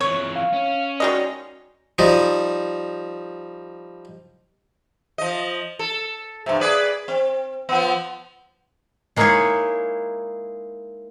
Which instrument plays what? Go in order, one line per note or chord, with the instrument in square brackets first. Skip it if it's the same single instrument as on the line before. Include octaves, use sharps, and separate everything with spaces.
[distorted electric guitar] F2 E3 [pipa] C#5
[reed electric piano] F5
[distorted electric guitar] C#4
[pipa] D#3 G#3 D#5 [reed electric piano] F#4 D5
[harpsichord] F3 G3 D#4
[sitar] F3 D#5
A4
G2 C3
G#4 B4 D5
C4
F3 B3
[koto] G#3 A#3 D#4 E4 G#4 C#5